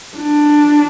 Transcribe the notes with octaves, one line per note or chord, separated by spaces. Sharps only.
D4